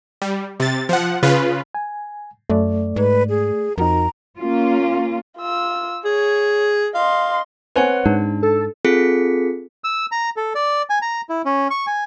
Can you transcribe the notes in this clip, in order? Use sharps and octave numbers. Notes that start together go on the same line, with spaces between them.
G3
C3 A6
F3 F#5
C#3 F4 B4
G#5
F#2 A3 D5
G#2 B4
G#4
F2 D#4 F#4 A#4 A#5
A#3 C#4 F4
F4 E6
G#4 C#5
D#5 F5 C6
C4 B4 C#5 F#5 G#5
G#2 D4
A4
C4 F4 G#4 A4 B6 C#7
E6
A#5
A4
D5
G#5
A#5
E4
C#4
C#6
G#5